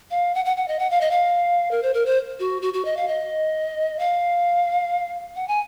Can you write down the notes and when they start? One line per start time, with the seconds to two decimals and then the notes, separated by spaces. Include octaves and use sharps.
0.11 F5
0.35 F#5
0.45 F#5
0.57 F#5
0.68 D#5
0.79 F#5
0.91 F5
1.01 D#5
1.11 F5
1.71 A#4
1.83 C5
1.94 A#4
2.06 C5
2.40 F#4
2.62 F#4
2.74 F#4
2.85 D#5
2.97 F5
3.08 D#5
3.99 F5
5.36 F#5
5.48 G#5